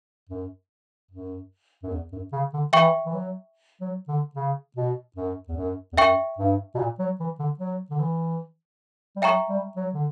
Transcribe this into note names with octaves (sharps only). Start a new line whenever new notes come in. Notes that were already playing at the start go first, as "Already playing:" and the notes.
F#2
F#2
F#2
E2
F#2
C#3
D3
E3 E5 G5 C#6
E3
F#3
F#3
D3
C#3
B2
F#2
E2
F#2
E2
F#2 E5 G5 C#6
G2
B2
A#2
F#3
E3
D3
F#3
D3
E3
G3
F#3 E5 G5 A#5 C#6
G3
F#3
D3